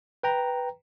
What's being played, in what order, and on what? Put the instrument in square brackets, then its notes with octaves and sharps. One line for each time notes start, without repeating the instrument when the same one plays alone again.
[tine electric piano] B4 G5 A#5